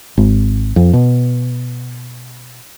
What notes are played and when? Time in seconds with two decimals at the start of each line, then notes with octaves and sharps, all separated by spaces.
0.17 G#1
0.76 F2
0.93 B2